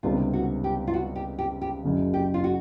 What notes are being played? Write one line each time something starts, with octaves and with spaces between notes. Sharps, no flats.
C#2 C3 D#3 G3 B3 F4
F#4
G4
F4
F#4
G4
G4
G4
F#1 F#2 C#3
G4
F4
F#4